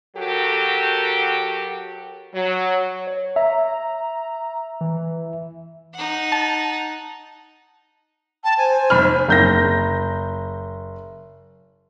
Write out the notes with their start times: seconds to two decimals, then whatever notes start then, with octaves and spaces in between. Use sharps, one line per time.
0.17 F#3 F#4 G4 A4 A#4
2.34 F#3
3.07 C#5
3.36 E5 A#5
4.81 E3
5.95 D#4 F#5
6.32 A5
8.44 G5 A5
8.58 C5 G#5
8.90 F1 B5 F6
9.28 F#1 G6 A#6